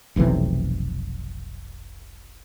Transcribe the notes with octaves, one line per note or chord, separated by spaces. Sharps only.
F1 B1 C3 E3